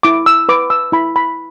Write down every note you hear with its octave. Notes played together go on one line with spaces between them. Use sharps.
E4 D6
E6
B4 D6
E6
E4 B5
B5